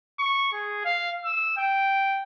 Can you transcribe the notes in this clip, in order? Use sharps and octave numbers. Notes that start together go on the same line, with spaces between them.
C#6
G#4
F5
E6
G5